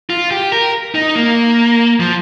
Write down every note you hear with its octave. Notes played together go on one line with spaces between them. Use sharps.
F4
G4
A#4
D#4
A#3
F3